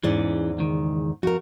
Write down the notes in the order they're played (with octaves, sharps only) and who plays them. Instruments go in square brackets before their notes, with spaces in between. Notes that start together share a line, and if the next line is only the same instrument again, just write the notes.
[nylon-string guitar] E2 G#2 D5 [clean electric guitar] E3 C#4
[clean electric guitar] C#2 D#3
[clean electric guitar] F2 [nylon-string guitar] F#4 A#4